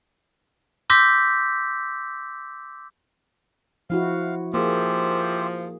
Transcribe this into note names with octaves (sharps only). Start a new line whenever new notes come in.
C6 D6 E6 G6 A#6 B6
F3 E4 F#4 F5
F3 A#3 G4 G#4 C5 E5